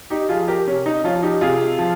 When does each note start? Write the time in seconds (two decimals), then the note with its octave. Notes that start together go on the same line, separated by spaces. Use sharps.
0.10 D#4 G4
0.29 F3 F4 G#4
0.48 G4 A#4
0.67 C3 C#4
0.86 D#4
1.04 F3 C#4 F4
1.23 D#4 G4
1.41 C3 F4 G#4
1.79 F3